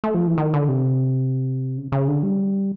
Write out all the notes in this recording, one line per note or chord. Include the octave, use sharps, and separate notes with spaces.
A3
F3
E3
D#3
D3
C3
C#3
C#3
D3
G3